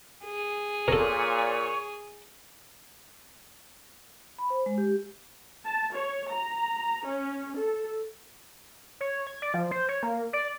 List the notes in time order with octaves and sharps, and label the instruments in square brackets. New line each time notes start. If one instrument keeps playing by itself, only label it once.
[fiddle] G#4
[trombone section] A#2 [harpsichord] A4 A#4 [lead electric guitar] C#5
[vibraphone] B5
C5
G#3
G4
[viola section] A5
C#5
A#5
C#4
A4
[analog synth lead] C#5
G#6
D5
F3
C5
C#5
A#3
D5